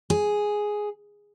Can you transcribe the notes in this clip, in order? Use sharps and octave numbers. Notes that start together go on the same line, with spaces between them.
G#4